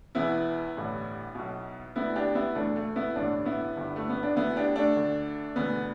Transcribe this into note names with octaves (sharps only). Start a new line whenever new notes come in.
E1 E2 E3 B3 E4
A1 G2 D3
B1 B2
D2 D3 B3 E4
D4 G4
B3 E4
E1 D2 D3 A3 D4
A3
B3 E4
A1 G2 D3 A3 D4
B3 E4
G1 G2 D3
A3
B3
D4
D2 D3 B3 E4
D4 G4
A3 D4
D2 D3
E1 D2 D3 B3